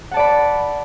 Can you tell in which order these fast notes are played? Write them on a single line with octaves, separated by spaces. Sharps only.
F#5 A5 D5 B5